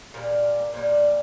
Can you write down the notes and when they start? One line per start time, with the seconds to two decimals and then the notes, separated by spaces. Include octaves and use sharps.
0.14 A#2 G3 A#4
0.74 A#2 G3